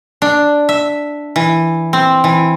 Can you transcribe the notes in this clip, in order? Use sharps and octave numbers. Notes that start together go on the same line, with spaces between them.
D4
E5
E3
C4
E3